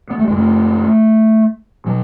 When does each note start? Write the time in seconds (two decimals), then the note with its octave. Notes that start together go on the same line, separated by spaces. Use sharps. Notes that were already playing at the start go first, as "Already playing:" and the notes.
0.11 B3
0.19 A3
0.28 F#2 C#3 G#3
0.37 A3
1.86 B2 F#3